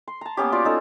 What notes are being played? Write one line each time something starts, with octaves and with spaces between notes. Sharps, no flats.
C6
A5 A#5
A#3 B3 C#4 G4
F4 F#4 D5
C#4 D#4 A4